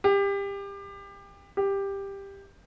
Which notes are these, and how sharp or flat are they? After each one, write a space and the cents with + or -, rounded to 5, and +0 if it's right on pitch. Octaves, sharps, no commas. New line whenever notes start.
G4 +25
G4 +10